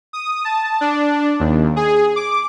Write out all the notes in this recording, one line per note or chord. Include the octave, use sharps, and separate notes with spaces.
D#6
A5
D4
D#2
G#4
D6